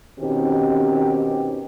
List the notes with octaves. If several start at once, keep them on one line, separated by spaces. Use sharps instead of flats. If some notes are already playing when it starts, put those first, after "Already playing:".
B2 D#3 C4 C#4 D#4 G4